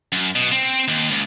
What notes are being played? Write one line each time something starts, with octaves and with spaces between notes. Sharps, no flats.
F#2
B2
C4
D#2
C#2